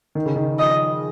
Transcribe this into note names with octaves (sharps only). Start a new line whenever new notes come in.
D#3
C#3
D#3
F3 D#5